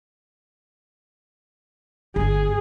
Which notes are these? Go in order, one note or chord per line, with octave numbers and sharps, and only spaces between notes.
G1 G#4